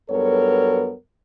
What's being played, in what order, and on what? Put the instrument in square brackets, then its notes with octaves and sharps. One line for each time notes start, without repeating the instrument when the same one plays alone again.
[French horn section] G2 F#3 B3 A4 A#4 C#5